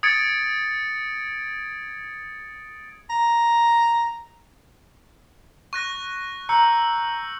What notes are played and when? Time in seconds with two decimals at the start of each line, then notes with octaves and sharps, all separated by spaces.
0.03 D#6 G#6 A6 C#7 D7
3.10 A#5
5.73 C#6 F#6 A#6
6.49 A#5 E6 G6 C#7